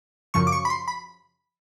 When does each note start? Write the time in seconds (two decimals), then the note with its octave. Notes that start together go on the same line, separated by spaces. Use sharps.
0.34 F#2 C#3 F3 C#6
0.47 D6
0.52 C#6
0.65 B5
0.70 C6
0.88 B5